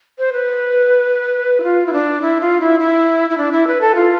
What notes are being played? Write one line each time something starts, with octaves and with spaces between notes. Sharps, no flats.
C5
B4
E4
F4
E4
D4
E4
F4
E4
E4
E4
D4
E4
B4
A4
F4